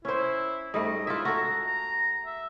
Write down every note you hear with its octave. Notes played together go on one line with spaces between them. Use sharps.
C#4 E4 C5
G#2 G3 A3 D#5
E4 F4 E5
F#4 A4 A#5
A#5
E5